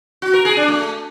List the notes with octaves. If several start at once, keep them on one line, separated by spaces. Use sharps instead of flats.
F#4
A#4
G#4
D4
A3